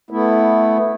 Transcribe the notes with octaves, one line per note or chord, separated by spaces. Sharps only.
A3 B3 E4